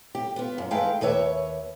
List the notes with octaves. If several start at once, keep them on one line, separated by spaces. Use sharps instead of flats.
G4
B3 F4
F#2
D#3 G#3 A3 B4 F5 G5
D#2 B4 C#5 E5